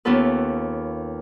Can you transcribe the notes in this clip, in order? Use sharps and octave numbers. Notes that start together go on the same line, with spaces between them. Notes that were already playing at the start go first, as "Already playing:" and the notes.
D#2 B3 C#4 F4 A4 B4